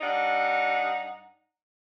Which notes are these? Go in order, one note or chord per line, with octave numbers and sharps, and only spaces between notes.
G2 D#4 D5 F#5